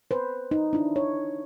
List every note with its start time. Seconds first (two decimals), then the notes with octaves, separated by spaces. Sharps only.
0.11 B4 C5
0.51 D#4
0.73 D4 E4
0.96 C#5